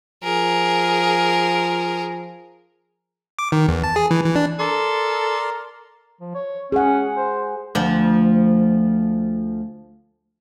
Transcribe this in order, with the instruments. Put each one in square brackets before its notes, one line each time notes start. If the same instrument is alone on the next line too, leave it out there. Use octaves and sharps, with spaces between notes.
[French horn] F3 [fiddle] G#4 A#4
[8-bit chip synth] D6
D#3
E2
A5
G#4
E3
E3
D4
[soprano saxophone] A4 [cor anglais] A#4 [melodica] D5 C6
[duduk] F3
C#5
[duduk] C#4 [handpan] G#4 F#5
[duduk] C5
[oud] D2 F3